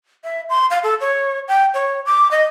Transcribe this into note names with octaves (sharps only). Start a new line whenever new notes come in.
E5
C6
F5
A4
C#5
G5
C#5
D6
D#5